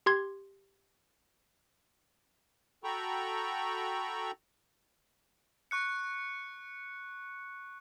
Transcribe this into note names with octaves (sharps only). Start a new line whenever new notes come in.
G4 C6 G#6
F#4 A4 G5 A#5 B5 C#6
C#6 F#6 C#7